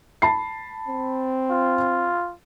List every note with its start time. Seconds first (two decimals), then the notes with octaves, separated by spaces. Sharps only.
0.22 A5 B5 C7
0.88 C4
1.51 F4